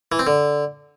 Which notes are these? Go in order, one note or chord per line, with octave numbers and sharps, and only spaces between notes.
E3
C4
D3